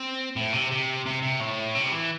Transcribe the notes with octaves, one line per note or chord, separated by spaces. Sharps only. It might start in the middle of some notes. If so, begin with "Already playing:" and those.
Already playing: C4
A2
C3
C3
C3
C3
A2
C3
G3
E3